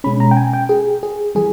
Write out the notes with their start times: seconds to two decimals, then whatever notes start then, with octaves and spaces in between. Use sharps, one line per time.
0.04 B2 G#3 C#4 B5
0.20 A#5
0.31 G5
0.37 G#5
0.53 G5
0.69 G#4
1.03 G#4
1.35 E3 G3 G#4